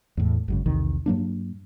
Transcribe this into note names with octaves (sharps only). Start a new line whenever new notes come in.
E2 A2
G#1 F#2 C#3
B1 E2 C3 D#3
G2 F#3 A#3 D4